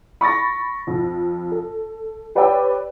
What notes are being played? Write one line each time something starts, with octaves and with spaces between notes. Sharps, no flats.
B5 C#6 A6 A#6
F2
A4
G4 B4 C#5 D5 G5 E6